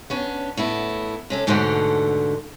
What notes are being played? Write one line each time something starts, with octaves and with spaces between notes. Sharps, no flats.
B3 C#4 D4
A2 B3 E4
C3 C#4 A4
G#2 B2 D3 A3 C5 F#5